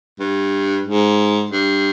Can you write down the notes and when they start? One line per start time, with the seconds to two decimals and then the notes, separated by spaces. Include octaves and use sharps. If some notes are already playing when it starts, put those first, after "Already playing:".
0.20 G2
0.85 G#2
1.51 G2